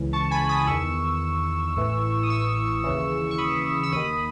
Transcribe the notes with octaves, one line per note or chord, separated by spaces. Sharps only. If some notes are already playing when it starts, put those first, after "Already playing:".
Already playing: C#2 C#3 E3
A5 C#6
G#5 B5
B5 D#6
E2 D#3 C#6 E6
A1 A2 E3
D#6
C#6 E6
D#2 C#3 E3
C#6
B5 D#6
E6
D#2 D#3 B5 D#6